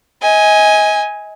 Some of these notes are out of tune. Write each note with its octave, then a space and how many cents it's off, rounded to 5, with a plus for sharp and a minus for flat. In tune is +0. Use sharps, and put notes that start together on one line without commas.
D#5 +30 G#5 +0